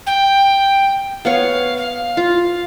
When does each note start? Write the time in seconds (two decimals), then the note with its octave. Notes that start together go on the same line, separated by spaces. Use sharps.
0.06 G5
1.25 B3 C#5 F5
1.77 F5
2.17 F4